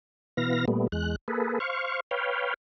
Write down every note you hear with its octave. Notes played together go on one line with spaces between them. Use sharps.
B2 E3 B3 F5 A#6
A#2 G3 A3 B3
E2 G#3 F#6
A#3 G#4 A4 B4
C5 F5 C#6
B4 C#5 F5 G5